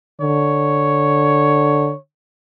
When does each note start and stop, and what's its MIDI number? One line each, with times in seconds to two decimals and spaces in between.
0.21 1.93 50
0.21 1.99 73